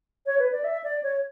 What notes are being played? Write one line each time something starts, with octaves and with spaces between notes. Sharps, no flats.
C#5
B4
D5
E5
D5
C#5